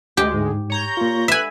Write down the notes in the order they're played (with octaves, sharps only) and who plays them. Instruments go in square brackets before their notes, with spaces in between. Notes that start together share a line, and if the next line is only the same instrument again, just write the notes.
[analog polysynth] D2 G#3 [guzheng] G4
[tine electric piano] G#2
[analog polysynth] C#5 A#5 G6
[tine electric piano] A#3 F4
[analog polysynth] B4 B5 [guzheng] E5 G#5